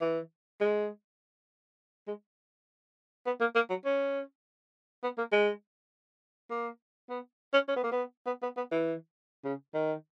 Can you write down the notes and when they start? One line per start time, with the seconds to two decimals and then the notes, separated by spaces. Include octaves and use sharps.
0.01 E3
0.61 G#3
2.08 G#3
3.26 B3
3.41 A#3
3.55 A#3
3.70 F#3
3.85 C#4
5.03 B3
5.18 A#3
5.32 G#3
6.50 A#3
7.10 B3
7.54 C#4
7.68 C#4
7.76 B3
7.83 A#3
7.92 B3
8.26 B3
8.42 B3
8.57 B3
8.71 E3
9.44 C#3
9.74 D#3